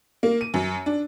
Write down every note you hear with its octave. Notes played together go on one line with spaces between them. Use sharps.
A#3
D#7
F#2
D4